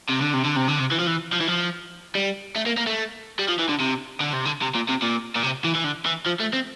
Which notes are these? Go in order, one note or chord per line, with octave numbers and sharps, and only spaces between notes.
C3
D3
C3
D3
C3
D3
C3
E3
F3
E3
F3
E3
F3
G3
A3
A#3
A#3
A3
G3
F3
E3
D3
C3
D3
C3
D3
C3
A#2
C3
A#2
A#2
C3
E3
E3
D3
E3
F3
A3
C4